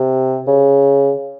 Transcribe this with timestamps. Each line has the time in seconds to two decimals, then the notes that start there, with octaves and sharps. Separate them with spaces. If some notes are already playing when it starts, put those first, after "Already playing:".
Already playing: C3
0.47 C#3